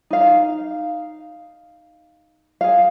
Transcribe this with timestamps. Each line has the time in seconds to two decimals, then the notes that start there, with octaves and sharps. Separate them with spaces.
0.10 D#4 F5
2.61 G#4 F5